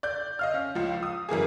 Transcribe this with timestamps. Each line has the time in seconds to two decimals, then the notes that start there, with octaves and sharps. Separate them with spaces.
0.03 D5 G6
0.39 D#5 F5 F6
0.54 C#4
0.75 C#2 F3
1.03 D#6
1.29 F#2 E3 A#3 G#4